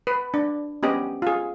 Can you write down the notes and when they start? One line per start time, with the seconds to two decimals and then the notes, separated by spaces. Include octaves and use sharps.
0.07 B4
0.34 D4
0.83 B3 C#4 G4 D#5
1.22 F4 G#4